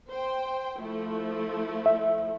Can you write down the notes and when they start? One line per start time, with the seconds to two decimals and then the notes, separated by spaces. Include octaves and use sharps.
0.12 C5 G5
0.79 F3 A3 E4
1.86 E5